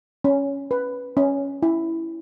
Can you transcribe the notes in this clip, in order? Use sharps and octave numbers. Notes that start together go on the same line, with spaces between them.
C#4
B4
C#4
E4